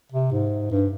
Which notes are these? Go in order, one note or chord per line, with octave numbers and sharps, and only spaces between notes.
C3
G#2
G2